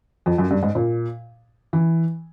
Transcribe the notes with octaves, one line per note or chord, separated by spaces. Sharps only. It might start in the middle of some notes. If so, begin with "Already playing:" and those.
F2
F#2
G2
G#2
A#2
E3